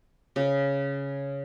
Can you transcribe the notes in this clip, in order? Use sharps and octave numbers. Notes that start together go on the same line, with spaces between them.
C#3